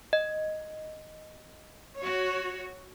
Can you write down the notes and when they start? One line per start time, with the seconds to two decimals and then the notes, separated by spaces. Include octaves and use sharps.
0.13 D#5
1.97 F#4 C#5